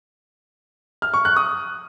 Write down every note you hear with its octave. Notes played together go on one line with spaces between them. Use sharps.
F6
C#6
F#6
D#6